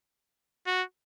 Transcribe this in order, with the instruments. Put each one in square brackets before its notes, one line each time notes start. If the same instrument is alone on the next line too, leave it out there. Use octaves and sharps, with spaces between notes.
[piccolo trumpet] F#4